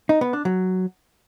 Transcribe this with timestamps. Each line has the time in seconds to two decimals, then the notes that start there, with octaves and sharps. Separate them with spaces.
0.09 D#4
0.21 B3
0.33 D4
0.45 F#3